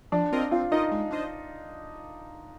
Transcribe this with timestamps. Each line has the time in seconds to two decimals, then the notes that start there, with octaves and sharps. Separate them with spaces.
0.12 F3 D4
0.32 C4 F4 A#4 D#5
0.51 C4 F4
0.71 D#4 F4 A#4 D#5
0.91 G#3
1.11 D4 F4 C5 D#5